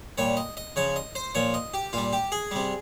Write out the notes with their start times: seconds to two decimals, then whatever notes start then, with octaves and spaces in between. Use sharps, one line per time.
0.18 A#2 G3 C#5
0.37 D#5
0.57 D#5
0.76 C#3 F3 C#5
0.96 D#5
1.15 C5
1.35 A#2 F3 C#5
1.54 D#5
1.74 G4
1.93 A#2 G3 F4
2.13 G4
2.32 G#4
2.51 C3 G3